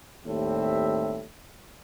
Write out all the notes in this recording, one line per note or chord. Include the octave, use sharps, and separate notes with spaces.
D#2 A2 G3 C4 E5